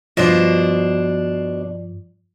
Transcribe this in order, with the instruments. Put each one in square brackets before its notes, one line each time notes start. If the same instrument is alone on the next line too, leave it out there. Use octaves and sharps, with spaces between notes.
[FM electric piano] G2 F3 [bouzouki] B2 D4 C5